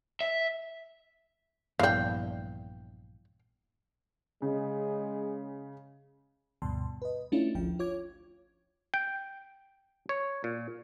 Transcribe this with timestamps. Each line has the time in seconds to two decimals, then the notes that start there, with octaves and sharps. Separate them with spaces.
0.21 E5
1.79 A#1 G2 E3 B3 D4 F5 G5
4.42 C#3 G#3
6.62 D2 G2 B2 A5 C6
7.02 B4 D#5
7.32 A3 C#4 D4 E4 F4
7.55 G#1 D2 F3 G5
7.79 F4 C#5 D6 G#6
8.94 G5
10.09 C#5
10.44 A#2